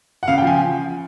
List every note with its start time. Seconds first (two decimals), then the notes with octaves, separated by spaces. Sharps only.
0.23 F#5
0.28 C#3 F5
0.38 G5
0.42 F3 G#5